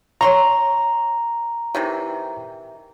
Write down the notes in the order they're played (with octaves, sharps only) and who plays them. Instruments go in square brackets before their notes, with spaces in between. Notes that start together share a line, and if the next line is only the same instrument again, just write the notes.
[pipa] C#5 C6 C#6 [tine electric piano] A#5
[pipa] C3 D#3 E3